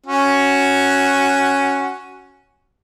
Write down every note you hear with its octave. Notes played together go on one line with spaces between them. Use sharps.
C#4 F#4